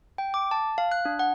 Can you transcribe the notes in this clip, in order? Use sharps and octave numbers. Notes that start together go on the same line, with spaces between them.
G5
D6
A5
F5
F#6
D4
F#5